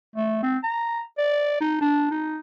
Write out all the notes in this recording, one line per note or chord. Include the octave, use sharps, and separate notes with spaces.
A3
C4
A#5
D5
D#4
D4
D#4